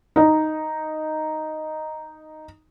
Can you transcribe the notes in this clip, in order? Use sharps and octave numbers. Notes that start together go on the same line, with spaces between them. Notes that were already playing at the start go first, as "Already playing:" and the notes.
D#4 D#5